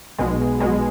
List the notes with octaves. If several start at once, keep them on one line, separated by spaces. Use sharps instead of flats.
B1 B2 G#3
B1 B2 G#3